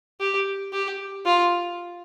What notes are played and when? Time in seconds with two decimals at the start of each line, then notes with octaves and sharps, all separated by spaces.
0.20 G4
0.73 G4
1.26 F4